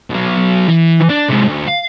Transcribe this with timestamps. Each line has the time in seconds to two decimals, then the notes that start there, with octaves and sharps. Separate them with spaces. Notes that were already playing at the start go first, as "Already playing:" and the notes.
0.10 B1 F#3
0.68 E3
1.10 D4
1.30 C3 G#3
1.48 D2
1.68 F5